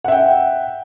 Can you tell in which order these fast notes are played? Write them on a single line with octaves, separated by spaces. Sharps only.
F#5 E5 G5